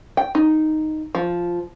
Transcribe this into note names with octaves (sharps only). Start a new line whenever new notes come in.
G5
D#4
F3